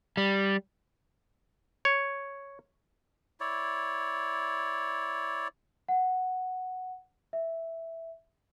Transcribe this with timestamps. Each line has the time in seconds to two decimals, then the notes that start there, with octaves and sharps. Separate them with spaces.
0.17 G3
1.85 C#5
3.40 E4 C#5 D5
5.88 F#5
7.33 E5